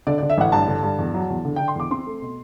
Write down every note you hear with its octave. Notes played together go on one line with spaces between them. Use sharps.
D3 D5
D3 D5
E5
A1 F#5
G2 A5
D3
G2
E2
F#3
E2
D3
D3 G5
C6
E2 D6
C4 C6
A3
B2